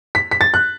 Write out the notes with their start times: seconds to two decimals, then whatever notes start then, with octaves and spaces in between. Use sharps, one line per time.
0.15 B6
0.31 B6
0.41 A6
0.54 F#6